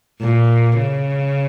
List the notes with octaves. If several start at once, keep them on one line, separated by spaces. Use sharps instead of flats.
A#2
C#3